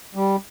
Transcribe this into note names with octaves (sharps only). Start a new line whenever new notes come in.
G3